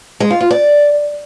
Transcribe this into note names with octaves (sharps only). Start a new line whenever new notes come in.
G#3
F4
F4
D5